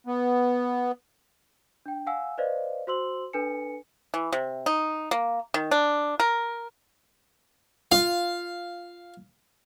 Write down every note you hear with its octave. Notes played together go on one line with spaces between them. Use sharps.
B3
D4 G5
F5 F#5 G#5 E6
B4 C5 D5 D#5 F5
F#4 C5 C6 E6 F#7
D4 A4 B4 G#5 C#7
E3
C3
D#4
A#3
D#3
D4
A#4
F4 F5